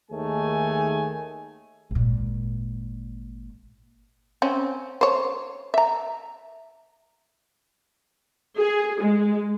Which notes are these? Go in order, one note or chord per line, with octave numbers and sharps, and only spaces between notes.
D#2 D#3 A3 G#4 G#5 A5
G#1 A#2
C4 C#4
C5 C#5
E5 A#5
G#4
G#3